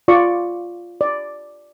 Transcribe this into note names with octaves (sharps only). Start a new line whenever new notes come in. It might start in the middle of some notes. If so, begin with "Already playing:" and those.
F4 D5 C#6
D5